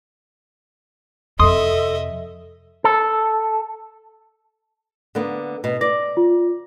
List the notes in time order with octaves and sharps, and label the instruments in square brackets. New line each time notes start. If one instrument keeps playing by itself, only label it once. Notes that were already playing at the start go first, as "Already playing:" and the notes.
[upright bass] F2 C3 [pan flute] A4 [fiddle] D#5 E5 [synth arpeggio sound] C6 D#6
[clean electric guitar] A4
[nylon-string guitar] D3 A#3 B3
B2
[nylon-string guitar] D5 [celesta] A#6
[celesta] F4